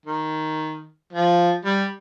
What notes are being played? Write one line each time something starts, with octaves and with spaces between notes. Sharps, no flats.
D#3
F3
G3